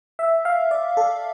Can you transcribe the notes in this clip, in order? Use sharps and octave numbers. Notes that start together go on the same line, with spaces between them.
E5
F5
D5
A4